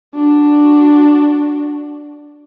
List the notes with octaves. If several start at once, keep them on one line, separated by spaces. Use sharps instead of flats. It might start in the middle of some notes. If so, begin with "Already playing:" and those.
D4 F#4